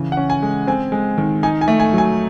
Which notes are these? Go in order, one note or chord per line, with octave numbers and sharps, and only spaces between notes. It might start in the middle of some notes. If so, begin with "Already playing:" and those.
Already playing: C#3 E3
F#5
C#4
G#5
G#3
C4 G#5
G#3
D#3
D#4 G#5
G#5
A3
G#5
F#3
G#5